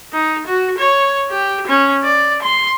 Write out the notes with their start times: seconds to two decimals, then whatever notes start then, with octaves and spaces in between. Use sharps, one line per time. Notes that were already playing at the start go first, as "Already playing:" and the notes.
0.13 D#4
0.47 F#4
0.78 C#5
1.31 G4
1.67 C#4
2.04 D5
2.42 C6